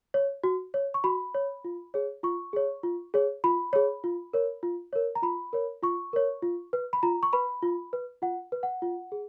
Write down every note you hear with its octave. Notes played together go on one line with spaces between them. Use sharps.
C#5
F#4
C#5
C#6
F#4 B5
C#5
F4
G#4 C#5
F4 C#6
G#4 C#5
F4
G#4 C#5
F4 B5
G#4 C#5
F4
A#4 C#5
F4
A#4 C#5
A#5
F4 B5
A#4 C#5
F4 C#6
A#4 C#5
F4
B4
B5
F4 A#5
C#6
B4 B5
F4
B4
F4 F#5
B4
F#5
F4
G#4